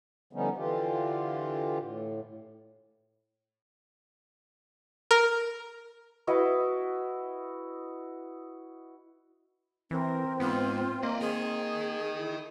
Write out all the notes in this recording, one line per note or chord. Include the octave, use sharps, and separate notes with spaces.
D3 F3 G3 B3 C#4 D#4
D3 E3 F4 G4
A2
A#4
E4 F#4 B4 D#5
E3 C4 A#4
G#2 B3 F4
A#3 D5 D#5
G#4 A#4 D#5
E4